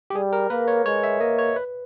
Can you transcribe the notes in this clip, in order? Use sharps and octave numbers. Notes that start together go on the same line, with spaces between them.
G4
G3 G#4
A#4
A#3 B4
C#5
G#3 C#5
E5
A#3 D#5
C#5
B4